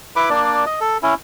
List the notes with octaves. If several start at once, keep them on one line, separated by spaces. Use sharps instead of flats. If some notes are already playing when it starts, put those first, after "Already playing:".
E4 B4 B5 D6
A#3 D4 D5
D#5
A4
C#4 E4